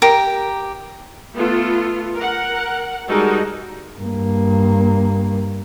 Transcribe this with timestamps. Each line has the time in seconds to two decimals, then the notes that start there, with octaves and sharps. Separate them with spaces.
0.02 G4 A#4
1.35 A3 B3 F4 A4
2.15 A#4 F#5
3.08 G3 G#3 D#4 F#4 A4 A#4
3.99 G2 A#3